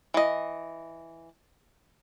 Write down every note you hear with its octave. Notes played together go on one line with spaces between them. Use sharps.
E3 D#5